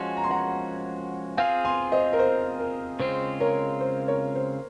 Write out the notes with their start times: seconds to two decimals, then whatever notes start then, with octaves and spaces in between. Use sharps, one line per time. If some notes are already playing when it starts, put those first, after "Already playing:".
Already playing: F3 G#3 C#4 F#4 G#5 C6
0.17 A#5
0.24 C6
0.30 F#5 A#5
1.37 C4 F4 G#4 F5 G#5
1.65 G#5 C6
1.92 C5 D#5
2.13 A#4
2.19 C5
2.59 A#4
3.00 C#3 G#3 C4 F4 C5
3.40 A#4 C#5
3.81 C5
4.08 A#4 C#5
4.35 C5